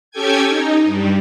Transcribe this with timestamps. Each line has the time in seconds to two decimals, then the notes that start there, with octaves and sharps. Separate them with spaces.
0.11 C#4 G4 A4 G5 G#5 G#6
0.48 D#4
0.84 G2 G3